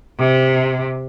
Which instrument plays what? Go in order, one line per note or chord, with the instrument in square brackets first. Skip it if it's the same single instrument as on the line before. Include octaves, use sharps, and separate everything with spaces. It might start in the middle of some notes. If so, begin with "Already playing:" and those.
[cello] C3